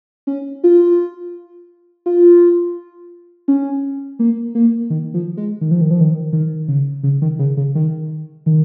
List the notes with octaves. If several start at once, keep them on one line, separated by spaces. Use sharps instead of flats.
C#4
F4
F4
C#4
A#3
A#3
D#3
F3
G#3
D#3
F3
D#3
F3
D#3
D#3
C#3
C#3
D#3
C#3
C#3
D#3
D#3